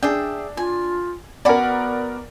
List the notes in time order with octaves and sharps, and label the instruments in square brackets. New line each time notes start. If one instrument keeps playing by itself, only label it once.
[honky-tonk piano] D4 [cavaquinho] G#4 E5 G5
[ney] F4 [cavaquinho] G#5
[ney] B3 [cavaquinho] F#4 G#5 B5 [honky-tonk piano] A#4 D5